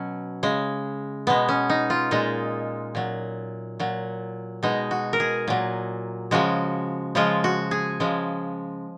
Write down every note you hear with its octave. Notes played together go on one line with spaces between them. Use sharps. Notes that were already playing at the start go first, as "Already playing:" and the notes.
Already playing: B2 F#3 C#4
C#3 G#3
B2 G#3 B3
C#4
D#4
F4
A#2 G#3 D#4
A#2 F#3
A#2 F#3
B2 G#3 D#4
F#4
A#4
G#4
A#2 F#3
C#3 F3 G#3 F#4
C#3 F3 G#3 F4
F#4
G#4
C#3 F3 G#3